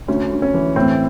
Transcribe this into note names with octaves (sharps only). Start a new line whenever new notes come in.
D2 C#4
D2
C#4
E3
A2 C4